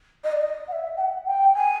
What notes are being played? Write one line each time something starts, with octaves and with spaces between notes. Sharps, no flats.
D#5
D5
D#5
F#5
E5
G5
F#5
G5
G#5